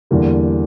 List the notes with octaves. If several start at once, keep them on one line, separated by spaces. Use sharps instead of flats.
E2 D3 G3 A#3